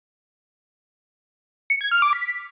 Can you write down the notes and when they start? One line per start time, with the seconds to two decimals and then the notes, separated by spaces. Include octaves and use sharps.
1.70 C#7
1.81 G#6
1.91 F6
2.02 D6
2.13 B6